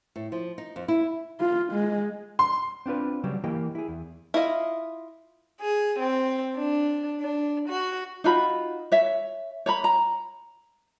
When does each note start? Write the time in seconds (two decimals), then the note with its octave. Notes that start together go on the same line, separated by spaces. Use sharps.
0.16 A2
0.32 F3
0.58 D#4
0.76 F2
0.88 E4
1.40 F4
1.73 G#3
2.39 C6
2.86 C4 D4 F4 B4
3.23 C#3 F#3 G3 G4
3.44 E3 A#3 G4 D#5
3.75 E4 G#4
3.88 E2
4.34 E4 F4 D#5 F5
5.61 G#4
5.99 C4
6.56 D4
7.22 D4
7.68 F#4
8.24 D#4 F4 F#4 B5
8.92 C#5 E5
9.66 C#5 A#5 B5
9.84 A#5